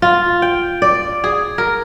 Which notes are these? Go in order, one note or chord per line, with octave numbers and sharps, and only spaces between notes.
F4
G5
D5
G#4
A#4